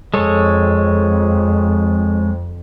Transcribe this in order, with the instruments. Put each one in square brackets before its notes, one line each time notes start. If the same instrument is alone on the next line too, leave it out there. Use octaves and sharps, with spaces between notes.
[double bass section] F2 [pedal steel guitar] G#3 A4 C#5